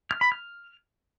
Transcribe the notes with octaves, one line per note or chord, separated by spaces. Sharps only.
F6
B5
F6